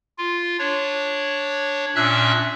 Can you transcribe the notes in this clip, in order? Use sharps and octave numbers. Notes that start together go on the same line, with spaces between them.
F4
D4 C#5
A#2 C#4 D4 E5 E6 F#6